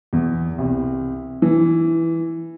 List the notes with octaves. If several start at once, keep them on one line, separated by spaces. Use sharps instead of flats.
E2
C2
E3